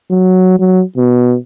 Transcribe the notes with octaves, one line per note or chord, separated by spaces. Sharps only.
F#3
F#3
B2